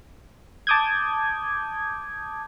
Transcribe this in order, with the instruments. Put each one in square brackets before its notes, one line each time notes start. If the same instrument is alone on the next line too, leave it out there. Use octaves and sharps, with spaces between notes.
[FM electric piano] A5 D6 D#6 G6 G#6